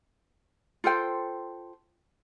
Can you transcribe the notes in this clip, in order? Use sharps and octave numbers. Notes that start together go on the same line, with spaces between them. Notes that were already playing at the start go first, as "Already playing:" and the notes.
F4 A4 C5 G5